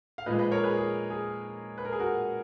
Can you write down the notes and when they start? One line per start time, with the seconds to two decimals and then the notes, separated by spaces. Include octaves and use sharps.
0.18 F5
0.26 A#2 F3 G#3 B4 D#5
0.39 B4 D#5
0.51 A#4 C#5
0.64 G#4 B4
0.77 G#4
1.10 G#4
1.78 B4
1.85 A#4
1.92 G#4
2.00 F#4 A#4